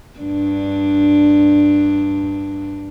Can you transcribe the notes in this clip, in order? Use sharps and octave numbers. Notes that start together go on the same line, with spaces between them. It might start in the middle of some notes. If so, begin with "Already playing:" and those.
G2 D4